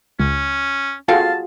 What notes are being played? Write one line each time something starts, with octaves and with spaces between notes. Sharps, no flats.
C#2 C#4
C4 F4 F#4 G#4 A4 F5 A5